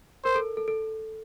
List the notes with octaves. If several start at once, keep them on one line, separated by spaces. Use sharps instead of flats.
A#4 C5
A4
A4
A4